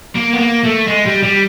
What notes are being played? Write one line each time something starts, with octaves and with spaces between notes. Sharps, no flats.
A#3
B3
A#3
A3
G#3
G3
G3